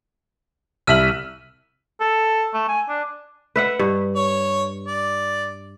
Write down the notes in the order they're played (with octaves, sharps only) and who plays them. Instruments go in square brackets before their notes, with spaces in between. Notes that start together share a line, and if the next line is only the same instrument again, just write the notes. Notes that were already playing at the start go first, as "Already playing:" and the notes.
[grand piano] C2 E5 F#7 [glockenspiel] E6 F6 D#7
[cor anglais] A4
A3
G#5
D4
[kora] B4 E5 F#5
G2
[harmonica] C#5
D5